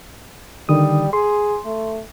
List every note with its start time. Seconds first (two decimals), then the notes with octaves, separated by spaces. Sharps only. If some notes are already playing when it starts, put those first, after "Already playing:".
0.69 D3 D#3 G3 D#6
1.13 G#4 C6
1.65 A3